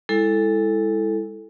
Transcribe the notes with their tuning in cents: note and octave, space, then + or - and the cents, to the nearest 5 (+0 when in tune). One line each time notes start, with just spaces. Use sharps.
G#3 -35 E4 +0 A4 +0